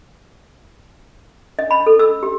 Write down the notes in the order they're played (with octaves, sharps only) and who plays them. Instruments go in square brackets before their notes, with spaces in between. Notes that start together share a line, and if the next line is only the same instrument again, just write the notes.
[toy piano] D#5
B5
A4
E6
G4